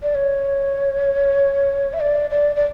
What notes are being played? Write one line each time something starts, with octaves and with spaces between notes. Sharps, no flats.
D5
C#5
E5
D5
D5
D5